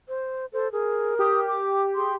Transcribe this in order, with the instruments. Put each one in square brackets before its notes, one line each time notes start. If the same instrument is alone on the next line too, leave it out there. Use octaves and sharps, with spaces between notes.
[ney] C5
[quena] A4 [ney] C5
[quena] G#4 [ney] A#4
[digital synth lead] G4 [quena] D#6
[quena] D6
[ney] G#4 [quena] C6